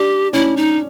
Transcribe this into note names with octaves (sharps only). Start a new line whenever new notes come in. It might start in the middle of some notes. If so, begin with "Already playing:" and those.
Already playing: D4 G4
C#4 E4
D#4